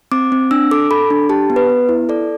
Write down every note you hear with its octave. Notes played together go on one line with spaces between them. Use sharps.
C4 D6
C4
D4 E6
A4 D6
A4 B5
D4
G4 A5
B3
B4
B3
E4
A4 D5